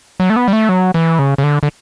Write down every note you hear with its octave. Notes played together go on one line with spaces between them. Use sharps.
F#3
A3
B3
G3
A3
F#3
E3
C#3
C#3
D3
D3